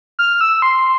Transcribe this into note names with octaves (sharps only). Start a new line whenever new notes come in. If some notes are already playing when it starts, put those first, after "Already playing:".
F6
E6
C6